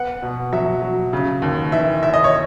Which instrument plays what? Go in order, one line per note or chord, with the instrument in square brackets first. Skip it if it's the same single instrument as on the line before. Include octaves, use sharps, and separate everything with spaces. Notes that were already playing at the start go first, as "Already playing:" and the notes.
Already playing: [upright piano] B3 F#5
B2
F#3 E5
F#3
C#3
D#2
E3 E5
D#2 E5
D#5
C#5